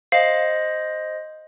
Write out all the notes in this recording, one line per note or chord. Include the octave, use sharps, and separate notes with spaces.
C5 D#5 F5